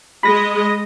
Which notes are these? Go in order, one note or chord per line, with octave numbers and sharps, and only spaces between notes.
G#3 D#5 B5 A#6